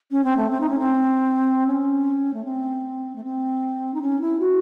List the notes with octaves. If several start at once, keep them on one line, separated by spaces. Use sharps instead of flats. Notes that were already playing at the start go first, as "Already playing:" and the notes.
C#4
C4
A3
C4
D#4
C#4
C4
C#4
A3
C4
A3
C4
D#4
C#4
E4
F#4